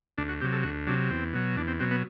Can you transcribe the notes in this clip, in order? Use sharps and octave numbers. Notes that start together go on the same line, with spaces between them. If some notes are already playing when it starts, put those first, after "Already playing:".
D2 D4
F#4
C3 F#3 G4
A4
D2 F#4
C3 F#3 D4
E2 C4
B2 F#3
E2 D4
C4
B2 F#3 C4
B3